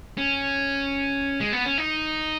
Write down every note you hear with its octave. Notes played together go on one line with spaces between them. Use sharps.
C#4
G#3
B3
C#4
D#4